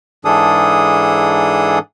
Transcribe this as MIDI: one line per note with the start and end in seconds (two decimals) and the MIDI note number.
0.25 1.79 44
0.25 1.79 52
0.25 1.79 62
0.25 1.79 68
0.25 1.79 69
0.25 1.79 87